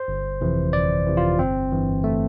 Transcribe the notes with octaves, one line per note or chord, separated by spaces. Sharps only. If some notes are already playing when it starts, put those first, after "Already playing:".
Already playing: C5
G1
F2 C3 E3
G1 D5
F2 C3 E3
F4
G1 C4
G2 E3
A3